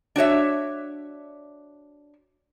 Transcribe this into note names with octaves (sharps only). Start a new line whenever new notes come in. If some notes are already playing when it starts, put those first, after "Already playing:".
D4 F#4 C#5 E5